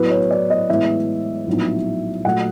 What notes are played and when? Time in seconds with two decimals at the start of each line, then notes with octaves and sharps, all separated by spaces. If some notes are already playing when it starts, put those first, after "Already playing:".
Already playing: A2 F#3 B3 E4 B4
0.10 C#5
0.31 D5
0.50 D#5
0.69 A2 E3 G#3 B3 E5
1.47 A#1 A2 F#3 B3 D#4
2.25 A#2 F#3 A3 F#5